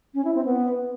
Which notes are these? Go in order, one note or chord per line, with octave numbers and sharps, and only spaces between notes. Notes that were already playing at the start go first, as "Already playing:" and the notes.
C#4
E4
C4
B3